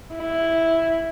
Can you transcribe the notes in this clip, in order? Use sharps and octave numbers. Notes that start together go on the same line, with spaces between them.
E4